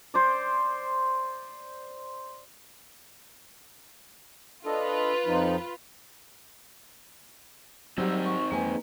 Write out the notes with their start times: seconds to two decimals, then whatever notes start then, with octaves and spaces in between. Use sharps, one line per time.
0.14 C5 D5
4.65 D4 F4 A4 B4 D#5
5.26 F2 F3 D#4
7.98 F#3 G3 C4 D#4 C5 E6
8.25 C#6
8.51 F2 G#3 A#3 B4 G#5